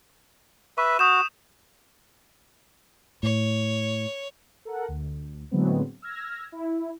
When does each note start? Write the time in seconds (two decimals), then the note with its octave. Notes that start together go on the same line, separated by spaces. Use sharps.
0.78 B4 E5 C#6
0.99 F#4 D#6 G6 E7
3.23 A2 C#5
4.65 A4 A#4 F#5
4.88 D2
5.51 A2 D3 F#3 G#3 B3 C4
6.02 E6 F6 G#6 A#6
6.52 E4